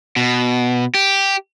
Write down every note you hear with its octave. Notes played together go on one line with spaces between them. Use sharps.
B2
G4